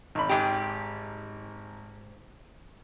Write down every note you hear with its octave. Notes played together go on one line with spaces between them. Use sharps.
G#1 B5
G#2 G4